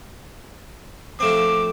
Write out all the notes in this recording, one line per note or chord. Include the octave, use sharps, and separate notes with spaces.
F3 A3 C4 D6